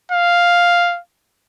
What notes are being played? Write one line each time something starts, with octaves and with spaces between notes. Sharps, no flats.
F5